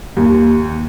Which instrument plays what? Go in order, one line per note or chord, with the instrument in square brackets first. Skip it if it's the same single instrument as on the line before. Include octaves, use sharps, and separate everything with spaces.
[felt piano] D#2